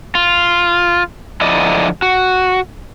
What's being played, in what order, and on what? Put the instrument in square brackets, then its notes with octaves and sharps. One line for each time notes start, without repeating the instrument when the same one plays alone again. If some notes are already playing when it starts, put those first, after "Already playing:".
[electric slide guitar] F4
D3 F3 E4 D5 D#5
F#4